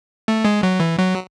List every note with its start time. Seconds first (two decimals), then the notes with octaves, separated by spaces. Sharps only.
0.28 A3
0.45 G#3
0.63 F#3
0.80 E3
0.98 F#3